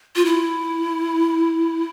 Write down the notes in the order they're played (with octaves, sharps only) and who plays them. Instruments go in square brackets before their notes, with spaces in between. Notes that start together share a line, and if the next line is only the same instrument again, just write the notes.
[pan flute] F4
E4